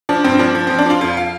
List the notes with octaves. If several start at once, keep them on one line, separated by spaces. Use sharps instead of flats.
F3 D4
G2 C4
F3 D4
F3
F3 C4
D4
F3 F4
F2 F4
F5